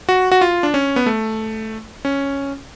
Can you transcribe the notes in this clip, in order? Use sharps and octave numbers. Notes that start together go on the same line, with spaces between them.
F#4
F#4
F4
D4
C#4
B3
A3
C#4